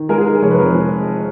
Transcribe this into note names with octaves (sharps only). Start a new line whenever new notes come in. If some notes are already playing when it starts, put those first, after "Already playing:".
Already playing: D#3
G#3 A#4
G#4
D#3 A#4
F1 C#5
B4
F2 A#4
G#3